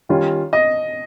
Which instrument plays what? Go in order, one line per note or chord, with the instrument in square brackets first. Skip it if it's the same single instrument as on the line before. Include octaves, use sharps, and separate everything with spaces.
[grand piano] D#3 G3 C#4 F4
[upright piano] D#5